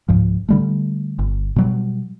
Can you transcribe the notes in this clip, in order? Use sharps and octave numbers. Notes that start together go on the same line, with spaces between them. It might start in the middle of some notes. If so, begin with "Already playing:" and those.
C#2 G#2 F3
D3 G3 A3
G1
B2 F#3 G3